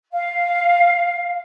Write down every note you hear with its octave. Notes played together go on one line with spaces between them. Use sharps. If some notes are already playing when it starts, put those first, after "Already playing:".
F5